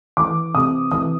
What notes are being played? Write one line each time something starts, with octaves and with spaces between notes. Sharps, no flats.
E3 D6
C3 D#6
E3 D#6